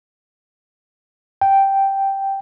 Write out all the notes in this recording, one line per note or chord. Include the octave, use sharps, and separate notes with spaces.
G5